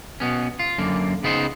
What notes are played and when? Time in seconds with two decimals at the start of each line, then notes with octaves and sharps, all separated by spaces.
0.20 B2 B3 C#4
0.59 F4
0.78 F#2 D3 A#3
1.23 C#3 B3 D#4 C5